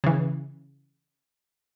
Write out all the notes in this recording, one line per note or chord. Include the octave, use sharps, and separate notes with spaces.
C#3 E3